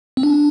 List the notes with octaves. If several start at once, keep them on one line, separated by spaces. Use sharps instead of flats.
C4
D4